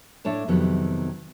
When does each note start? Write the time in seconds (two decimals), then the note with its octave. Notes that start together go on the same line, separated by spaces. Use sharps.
0.25 A2 A3 D4 C#5 A5
0.48 F2 C3 D#3 F#3 B3